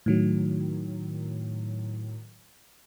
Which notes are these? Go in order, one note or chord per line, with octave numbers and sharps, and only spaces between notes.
A2 D#3 F#3